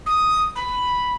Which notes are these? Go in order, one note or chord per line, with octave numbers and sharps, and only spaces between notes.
D#6
B5